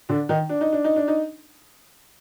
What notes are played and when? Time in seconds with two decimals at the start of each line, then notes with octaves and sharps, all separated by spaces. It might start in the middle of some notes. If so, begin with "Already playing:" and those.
0.09 D3 D4
0.29 D#3 D#4
0.49 D4
0.61 D#4
0.73 D4
0.84 D#4
0.96 D4
1.08 D#4